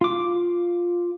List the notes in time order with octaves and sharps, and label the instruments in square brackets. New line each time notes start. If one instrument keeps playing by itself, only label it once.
[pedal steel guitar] F4 D6